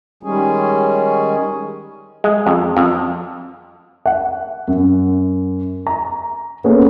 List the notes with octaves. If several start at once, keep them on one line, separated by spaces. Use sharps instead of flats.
D#3 G3 G#3 C#4 G#4
G#3
F2
F2
F#5
F#2
A#5
A#3 B3 C#4 G#4 A4